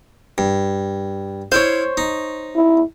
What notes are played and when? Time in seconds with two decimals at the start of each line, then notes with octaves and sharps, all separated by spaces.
0.38 G2
1.52 E4 C5 C#5 F5
1.97 D#4
2.55 E4